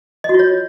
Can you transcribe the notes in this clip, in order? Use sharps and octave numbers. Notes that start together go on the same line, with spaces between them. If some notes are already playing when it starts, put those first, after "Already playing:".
D#5
F#4
F4
C#5